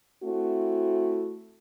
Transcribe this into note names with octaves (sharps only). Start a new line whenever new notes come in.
A3 C4 E4 F#4